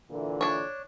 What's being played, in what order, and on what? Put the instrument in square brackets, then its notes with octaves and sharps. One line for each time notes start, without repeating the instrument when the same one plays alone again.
[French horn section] A#2 D3 E3
[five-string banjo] D4 C#5